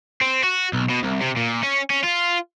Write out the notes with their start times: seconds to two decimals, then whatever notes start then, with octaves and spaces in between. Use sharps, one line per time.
0.22 C4
0.43 F#4
0.73 B1
0.90 B2
1.03 C2
1.21 C3
1.37 A#2
1.63 C#4
1.90 C#4
2.04 F4